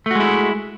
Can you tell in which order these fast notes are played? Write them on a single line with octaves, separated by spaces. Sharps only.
A3 F#4 G#3 E4